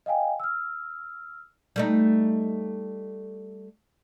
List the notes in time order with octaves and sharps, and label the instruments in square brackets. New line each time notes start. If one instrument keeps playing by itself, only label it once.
[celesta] D#5 F5 G5 G#5
E6 F6
[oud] G3 A3 D#4